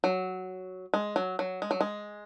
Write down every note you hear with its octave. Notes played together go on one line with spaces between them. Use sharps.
F#3
G#3
F#3
F#3
G#3
F#3
G#3